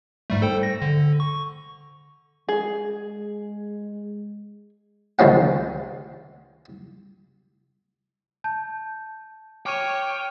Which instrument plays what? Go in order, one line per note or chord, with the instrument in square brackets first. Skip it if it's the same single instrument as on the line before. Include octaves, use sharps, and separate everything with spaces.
[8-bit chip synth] G#2 G3 A3
A4 C5 G5
A#6
D3
C#6
[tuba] G#3 [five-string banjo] G#4
[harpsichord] C#2 D#3 F3 C#4 F#5
[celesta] A5 G6
[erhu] C#5 [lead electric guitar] G5 [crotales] D6 F6 D#7